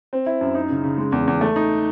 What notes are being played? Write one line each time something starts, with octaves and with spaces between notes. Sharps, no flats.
C4
E4
F#2
D#4
C#3
C#3
G#3
E2
E2
A3
D#4